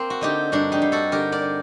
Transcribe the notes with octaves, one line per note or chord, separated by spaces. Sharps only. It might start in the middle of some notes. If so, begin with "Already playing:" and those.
Already playing: A#3 C4
F#4
D3 D#4 G4
G2 D4 F#4
D#4 G4
G2
F#4 A4
D3 G4 A#4
A#4 D5
D3